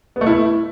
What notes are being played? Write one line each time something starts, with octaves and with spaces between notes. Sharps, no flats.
B3
A3
E4